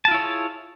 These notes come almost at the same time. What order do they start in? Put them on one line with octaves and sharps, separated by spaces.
A5 F4 E4 C#5 G#4